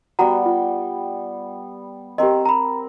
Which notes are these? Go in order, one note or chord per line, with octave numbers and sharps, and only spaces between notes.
G3 B3 F#4 F#5 G5 A#5
F4
C4 G4 A#4 D#5
A#5 B5